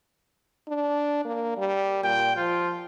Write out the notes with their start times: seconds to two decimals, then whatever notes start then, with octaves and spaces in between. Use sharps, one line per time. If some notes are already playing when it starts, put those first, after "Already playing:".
0.68 D4
1.25 A#3
1.58 G3
2.04 A#2 G5
2.36 F3 F4